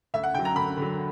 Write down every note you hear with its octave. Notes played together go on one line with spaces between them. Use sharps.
D2 E5
F#5
D3 F#3 G5
A#5
D2 B5
D3 F#3